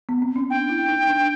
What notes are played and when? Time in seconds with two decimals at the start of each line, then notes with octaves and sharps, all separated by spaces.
0.09 B3
0.22 C4
0.36 C#4
0.50 D4 G5
0.70 E4
0.88 D#4
1.04 D#4
1.08 D4